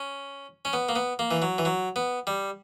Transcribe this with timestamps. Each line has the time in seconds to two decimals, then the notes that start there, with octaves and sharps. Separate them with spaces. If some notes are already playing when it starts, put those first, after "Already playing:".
Already playing: C#4
0.65 C#4
0.73 B3
0.89 A#3
0.96 B3
1.19 A#3
1.31 E3
1.42 F#3
1.58 E3
1.65 F#3
1.96 B3
2.27 G3